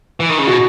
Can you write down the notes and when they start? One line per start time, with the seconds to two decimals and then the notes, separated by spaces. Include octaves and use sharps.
0.20 E3
0.30 D#3
0.39 C#3
0.47 B2 F#4